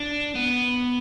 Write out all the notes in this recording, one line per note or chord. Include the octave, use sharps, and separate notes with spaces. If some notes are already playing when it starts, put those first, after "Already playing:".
Already playing: D4
B3